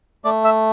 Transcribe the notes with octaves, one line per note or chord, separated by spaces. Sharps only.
A3 D5
E5